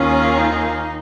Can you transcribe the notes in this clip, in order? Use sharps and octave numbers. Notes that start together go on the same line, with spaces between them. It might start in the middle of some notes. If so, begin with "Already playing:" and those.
Already playing: D#2 D#3 A#3 C#4 F4 G#4
D#4